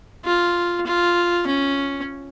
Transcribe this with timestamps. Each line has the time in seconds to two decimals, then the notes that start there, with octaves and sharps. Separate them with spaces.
0.25 F4
0.86 F4
1.47 C#4